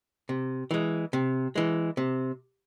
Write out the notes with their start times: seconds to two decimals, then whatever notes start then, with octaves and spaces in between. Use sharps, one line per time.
0.29 C3
0.71 E3 G#3
1.13 C3
1.55 E3 G#3
1.97 C3